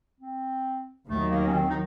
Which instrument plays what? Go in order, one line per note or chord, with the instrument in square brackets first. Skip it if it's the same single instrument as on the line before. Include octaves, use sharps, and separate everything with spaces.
[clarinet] C4
[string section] D#2 D#3 F#3 [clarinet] A3
[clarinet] A#3
C#4
C4
D#4